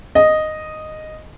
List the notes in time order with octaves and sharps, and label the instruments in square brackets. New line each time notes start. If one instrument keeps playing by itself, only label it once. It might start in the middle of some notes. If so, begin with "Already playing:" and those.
[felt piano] D#5